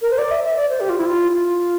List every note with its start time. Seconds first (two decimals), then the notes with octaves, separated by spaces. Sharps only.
0.02 A#4
0.11 C5
0.18 D5
0.31 E5
0.44 E5
0.56 D5
0.69 C5
0.80 G4
0.89 F4
0.98 E4
1.06 F4
1.32 F4